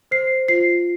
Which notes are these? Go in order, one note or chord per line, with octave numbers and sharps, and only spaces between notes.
C5 C7
F4 C7